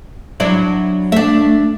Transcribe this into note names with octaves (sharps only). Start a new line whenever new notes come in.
F#3 D4 E4
A3 D4 E5